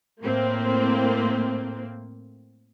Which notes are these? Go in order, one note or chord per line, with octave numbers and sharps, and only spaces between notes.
A2 A#3 C4